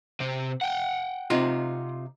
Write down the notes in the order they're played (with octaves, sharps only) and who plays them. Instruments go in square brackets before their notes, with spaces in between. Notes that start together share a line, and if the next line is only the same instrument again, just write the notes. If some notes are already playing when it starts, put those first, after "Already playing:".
[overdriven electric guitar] C3 C4
F#5 G5
[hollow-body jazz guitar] C3 D#4 F4